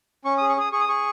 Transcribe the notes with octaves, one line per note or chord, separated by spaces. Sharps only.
C#4 C#6
D#6
G#4
C#6
G#4 D#6
G#4 C#6
D#6
G#4 C#6